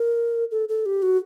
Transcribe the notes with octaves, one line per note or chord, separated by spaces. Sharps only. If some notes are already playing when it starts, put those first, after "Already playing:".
Already playing: A#4
A4
A4
G4
F#4